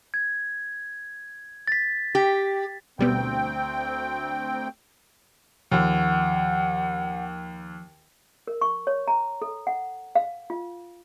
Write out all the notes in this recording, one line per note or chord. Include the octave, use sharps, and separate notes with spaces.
G#6
A6 B6
G4
D2 B2 G3 B3 C4 G5
D#2 F3 F#5
A#4
C#6
C#5
A#5
A4
F#5
F5
F4